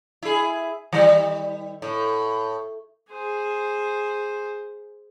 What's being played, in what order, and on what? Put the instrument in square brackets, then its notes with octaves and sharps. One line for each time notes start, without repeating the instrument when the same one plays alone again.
[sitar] E4 G#4
D#3 G3
A2
[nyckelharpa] G#4 C5